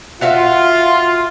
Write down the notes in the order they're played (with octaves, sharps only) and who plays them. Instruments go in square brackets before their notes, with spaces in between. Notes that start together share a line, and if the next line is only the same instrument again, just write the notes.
[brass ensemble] F4 [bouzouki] F#4 E5 F5